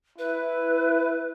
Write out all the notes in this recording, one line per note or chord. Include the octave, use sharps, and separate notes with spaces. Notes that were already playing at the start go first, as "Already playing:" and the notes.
E4 B4